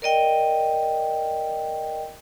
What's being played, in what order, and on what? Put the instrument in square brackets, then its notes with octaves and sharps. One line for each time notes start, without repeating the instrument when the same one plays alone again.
[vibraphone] A#4 D5 D#5 G5